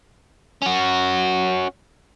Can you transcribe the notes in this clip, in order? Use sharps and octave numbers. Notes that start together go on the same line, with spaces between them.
C#4 F#4